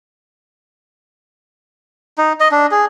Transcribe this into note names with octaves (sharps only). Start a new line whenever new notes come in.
D#4
D#5
D4
G#4